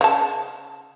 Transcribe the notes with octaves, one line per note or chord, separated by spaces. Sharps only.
C#3 A5